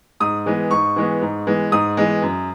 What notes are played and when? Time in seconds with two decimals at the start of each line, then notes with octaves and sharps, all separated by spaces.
0.20 G#2 D#6
0.46 E3 G#3 B3
0.71 G#2 C#6
0.96 E3 G#3 B3
1.21 G#2
1.47 E3 G#3 B3
1.72 G#2 D#6
1.97 E3 G#3 B3
2.22 F#2